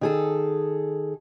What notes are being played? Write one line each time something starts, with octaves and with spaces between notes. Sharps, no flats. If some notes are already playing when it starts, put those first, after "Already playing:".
D#3 G#4 A4